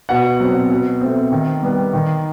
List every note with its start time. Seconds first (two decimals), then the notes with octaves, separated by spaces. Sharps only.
0.09 B2 F#5
0.40 F#3 C4
0.71 B2
1.01 A3 C4
1.32 D#3
1.63 G3 B3
1.93 D#3